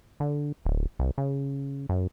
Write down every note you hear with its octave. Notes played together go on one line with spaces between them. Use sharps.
D3
D1
C2
C#3
F#2